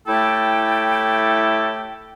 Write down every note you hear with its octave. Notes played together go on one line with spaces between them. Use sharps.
A2 A3 E4 G4 A4 G5